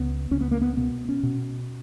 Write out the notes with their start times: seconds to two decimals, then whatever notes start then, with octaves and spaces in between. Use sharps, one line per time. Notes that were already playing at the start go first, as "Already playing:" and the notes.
Already playing: C#2 B3
0.31 C#2 C#4
0.41 B3
0.51 A#3
0.61 B3
0.77 B2 B3
1.09 C#4
1.23 B2